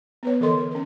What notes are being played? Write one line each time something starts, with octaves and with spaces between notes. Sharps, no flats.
B3 B4 C#5
D3 E3 A4 A#4 D#5 C6
A#4
C#4 A#4